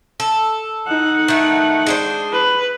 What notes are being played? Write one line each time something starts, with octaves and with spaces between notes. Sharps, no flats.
A4
D#4 F#5
D#3 A3
G#3 D4 C5
B4